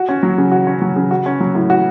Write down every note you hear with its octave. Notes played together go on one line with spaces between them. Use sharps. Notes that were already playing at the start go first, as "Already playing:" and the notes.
Already playing: F#4
C#4
F#3
C#3
F#4
C#4
F#3
C#3
F#4
C#4
F#3
A2
F#4